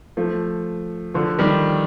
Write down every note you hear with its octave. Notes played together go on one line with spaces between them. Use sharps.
F3 A3
D3 F3
D#3 G3